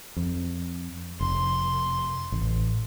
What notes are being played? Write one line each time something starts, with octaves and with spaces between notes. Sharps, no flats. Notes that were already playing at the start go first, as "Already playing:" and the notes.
F2
F1 C6
A1